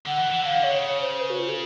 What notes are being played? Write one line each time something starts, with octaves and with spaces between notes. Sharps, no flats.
D3 F#5
E3
E3
D3 F5
D3
C#5
C#3
C#5
C5
B4
F#4
F4
A4